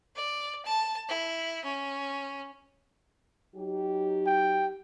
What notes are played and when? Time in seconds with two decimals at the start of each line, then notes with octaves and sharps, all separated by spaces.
0.16 D5
0.66 A5
1.09 E4
1.65 C#4
3.55 F#3 D#4 G4
4.26 G5